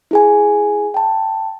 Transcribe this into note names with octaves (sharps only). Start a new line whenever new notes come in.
E4 G#4 G#5
G5 A5